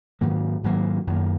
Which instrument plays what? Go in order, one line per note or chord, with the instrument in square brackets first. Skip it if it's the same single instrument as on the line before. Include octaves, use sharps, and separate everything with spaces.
[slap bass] G#2 D#3 F#3 A#3
G#2 D#3 F#3 A#3
F#2 D#3 A#3